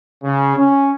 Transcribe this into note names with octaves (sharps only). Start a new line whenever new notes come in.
C#3
C#4